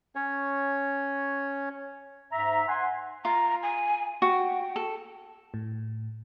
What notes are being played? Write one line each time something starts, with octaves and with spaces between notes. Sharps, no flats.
C#4 C#5
G#2 E5 A#5
F#5 G#5 C6
F4 A#5
G#5
F#4 G5
A4
A2